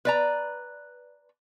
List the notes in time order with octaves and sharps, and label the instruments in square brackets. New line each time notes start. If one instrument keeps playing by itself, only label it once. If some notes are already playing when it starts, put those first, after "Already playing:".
[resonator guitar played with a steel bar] B4 D5 A#5